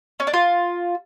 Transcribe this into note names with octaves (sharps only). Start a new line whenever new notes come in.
C#4
D4
F4